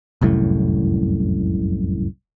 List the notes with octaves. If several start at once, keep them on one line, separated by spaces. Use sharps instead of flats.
F1 C2 F#2 A2